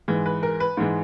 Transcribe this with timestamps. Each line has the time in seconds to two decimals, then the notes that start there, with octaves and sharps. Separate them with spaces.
0.08 G#2 E3 G#3
0.26 B4
0.43 A#4
0.60 B4
0.77 G#2 E3 G#3